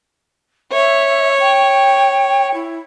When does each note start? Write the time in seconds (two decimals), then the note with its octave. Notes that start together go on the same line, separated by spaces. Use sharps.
0.72 C#5 E5
1.39 G5
2.54 E4